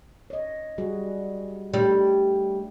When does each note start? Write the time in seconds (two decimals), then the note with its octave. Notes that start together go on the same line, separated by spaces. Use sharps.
0.30 C#5 D#5
0.78 G3 F#4 G#4
1.74 G3 A3 D4 C#5